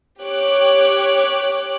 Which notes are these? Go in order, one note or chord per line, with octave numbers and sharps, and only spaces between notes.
G4 C#5 D6 F#6